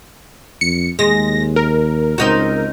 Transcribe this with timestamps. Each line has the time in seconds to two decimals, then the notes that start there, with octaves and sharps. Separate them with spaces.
0.61 F2 C#7
0.99 D#2 G#3 A#6
1.56 A#4
2.18 C#2 C4 D#4 F#4